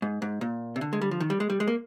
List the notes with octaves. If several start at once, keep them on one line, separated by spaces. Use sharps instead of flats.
G#2
G#2
A#2
C3
D3
G#3
G3
F3
D#3
G3
G#3
G3
G#3
A#3